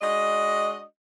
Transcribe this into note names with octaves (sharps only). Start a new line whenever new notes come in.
G#3 D4 F#4 D#5